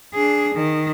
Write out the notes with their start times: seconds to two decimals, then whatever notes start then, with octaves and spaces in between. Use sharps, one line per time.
0.13 D4 G#4
0.55 D#3